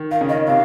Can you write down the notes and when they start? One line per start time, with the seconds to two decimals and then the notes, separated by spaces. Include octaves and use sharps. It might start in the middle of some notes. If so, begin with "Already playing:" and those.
Already playing: D#3
0.11 D#3 F5
0.21 C#3
0.29 D#3 D#5
0.47 C3 F5